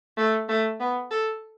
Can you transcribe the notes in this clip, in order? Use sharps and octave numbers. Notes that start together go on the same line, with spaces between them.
A3
A3
B3
A4